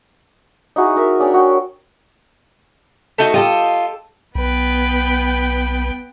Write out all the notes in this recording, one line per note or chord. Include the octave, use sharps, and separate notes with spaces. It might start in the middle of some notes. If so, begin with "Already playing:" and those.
D#4 E4 F#4 G#4
D#4 A#4 E5
D4 G#4 C#5 G5
F#4 G5
A3 D#4 F#4
F4 G4 A4 D#5
B1 B3 B4 G5